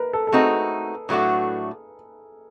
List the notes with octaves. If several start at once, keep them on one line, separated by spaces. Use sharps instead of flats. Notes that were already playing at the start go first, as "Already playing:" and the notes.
Already playing: A#4 B4
A4
A4
A3 C4 D#4 F#4 G#4
A2 F#3 A3 D4 F#4